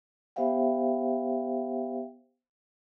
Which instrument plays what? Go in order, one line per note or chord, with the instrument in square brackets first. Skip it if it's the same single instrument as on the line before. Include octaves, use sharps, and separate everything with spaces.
[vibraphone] B3 G4 C5 E5 F5 G5